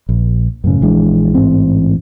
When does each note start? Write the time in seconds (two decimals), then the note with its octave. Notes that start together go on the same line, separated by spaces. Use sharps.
0.09 A#1
0.64 F#2 A2 C#3
0.81 A#1 E3 G#3 D4
1.35 A1 G#2 E3 C4